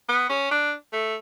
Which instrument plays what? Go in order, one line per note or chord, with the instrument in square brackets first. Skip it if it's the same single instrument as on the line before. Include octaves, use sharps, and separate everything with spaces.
[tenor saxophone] B3
C#4
D4
A3